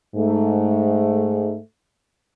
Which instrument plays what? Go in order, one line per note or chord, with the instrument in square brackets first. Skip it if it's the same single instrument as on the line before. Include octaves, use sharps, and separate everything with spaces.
[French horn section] G#2 A3